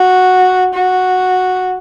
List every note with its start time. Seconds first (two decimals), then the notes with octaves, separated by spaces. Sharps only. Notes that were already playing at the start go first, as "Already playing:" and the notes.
Already playing: F#4
0.74 F#4